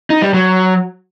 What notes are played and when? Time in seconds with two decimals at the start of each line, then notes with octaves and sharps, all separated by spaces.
0.10 D#4
0.22 G3
0.34 F#3